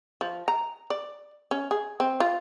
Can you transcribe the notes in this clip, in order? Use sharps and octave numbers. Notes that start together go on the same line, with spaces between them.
F3
A#5
D5
C#4
G#4
C4
F4